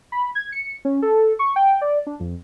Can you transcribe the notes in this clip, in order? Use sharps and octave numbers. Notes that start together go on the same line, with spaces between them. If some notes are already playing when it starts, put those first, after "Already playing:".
B5
G#6
C#7
C#4
A4
C#6
G5
D5
D4
F2